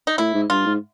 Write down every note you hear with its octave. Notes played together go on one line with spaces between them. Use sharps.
D#4
A2 E4
G#2
G2 F4
G#2